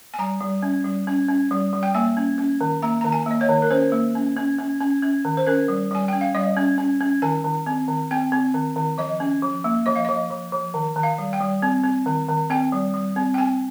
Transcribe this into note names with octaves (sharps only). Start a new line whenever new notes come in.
G#5
G3 A#5
G3
C#4
G3
C#4
C#4
G3
G3
G5
A#3 G#5
C#4
C#4
D#3
A#3 A#5
D#3 A#5
G#5
A#3 D#5
C#5
D#3
A#4
C#4 C5
A#3
C#4
C#4
C#4
C#4
C#4
D#3
C5
C#4 A#4
G3
G3 G#5
C#4 G5
F5
G3 D#5
C#4
C#4
C#4
D#3 G#5
D#3
C4
D#3
C4 G5
C4
D#3
D#3
F3 D#5
C#4
F3
A#3
F3 D#5
F5
F3 D#5
F3
F3
D#3
D#3
F5
G3
G5
G3
C4
C4
D#3
D#3
C4 G5
G3
G3
C4
G5
C4 G#5